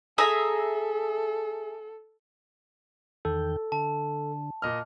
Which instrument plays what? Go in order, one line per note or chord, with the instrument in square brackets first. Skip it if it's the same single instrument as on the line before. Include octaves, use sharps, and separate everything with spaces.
[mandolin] G#4 E5 A#5 [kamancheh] A4
[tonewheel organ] E2 D#3 G5 [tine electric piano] A4
[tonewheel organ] D3 [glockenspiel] A5
[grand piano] A#2 D#5 F6